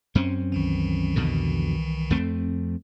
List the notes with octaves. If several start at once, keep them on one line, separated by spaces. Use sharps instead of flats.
F#2 C4 C#4
C2 D#3 E3
F2 B2 D3
F2 A3 C4